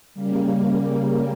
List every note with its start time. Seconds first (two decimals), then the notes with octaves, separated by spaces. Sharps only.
0.14 C#3 G3 A#3